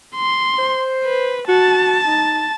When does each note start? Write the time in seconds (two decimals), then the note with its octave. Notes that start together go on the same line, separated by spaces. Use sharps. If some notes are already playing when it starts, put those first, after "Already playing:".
0.16 C6
0.58 C5
1.04 B4
1.48 F#4 A5
2.07 D#4